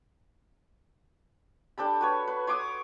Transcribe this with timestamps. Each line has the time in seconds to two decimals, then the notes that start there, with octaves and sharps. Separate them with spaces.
1.78 D4 G4 A4 B5
2.01 F#4 B4 C#5
2.27 B4
2.47 C#5 C6 D6 D#6